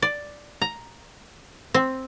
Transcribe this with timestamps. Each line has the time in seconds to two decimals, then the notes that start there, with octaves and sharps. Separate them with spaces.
0.02 D5
0.62 A#5
1.74 C4